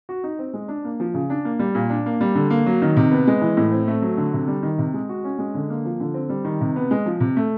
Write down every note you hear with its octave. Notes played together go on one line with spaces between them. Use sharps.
F#4
D#4
C4
G#3
D4
A#3
F3
C#3
D4
A#3
G3
A#2
D4
A#3
G3
D3
A#3
F#3
D#3
C3
B3
G#3
E3
A2
C4
A3
F#3
D3
C3
G3
D#3
C3
G#3
F#4
C#4
G#3
D3
A#3
F3
D3
C4
G3
D#3
C3
B3
G#3
F3
C3
A3